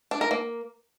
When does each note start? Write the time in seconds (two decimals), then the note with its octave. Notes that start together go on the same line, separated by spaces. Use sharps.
0.11 D4
0.21 A#4
0.31 A#3